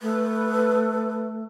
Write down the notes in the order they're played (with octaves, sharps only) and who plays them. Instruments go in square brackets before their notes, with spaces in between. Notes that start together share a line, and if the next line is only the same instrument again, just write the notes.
[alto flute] A3 [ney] B4